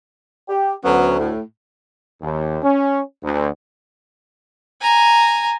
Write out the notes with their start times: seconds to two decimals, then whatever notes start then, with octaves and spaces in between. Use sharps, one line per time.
0.49 G4
0.85 D2 F#3 B3 C#4
1.19 A2
2.21 D#2
2.63 C#4
3.23 D2
4.82 G#5 A#5